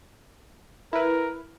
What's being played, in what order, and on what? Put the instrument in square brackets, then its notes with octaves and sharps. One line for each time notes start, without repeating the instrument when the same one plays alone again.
[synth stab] E4 B4 [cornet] A#4